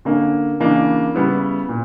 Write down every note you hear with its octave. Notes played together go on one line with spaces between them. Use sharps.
D3 A#3 C#4
C#3 E3 A#3 D4
C#3 G3 B3 E4
A#2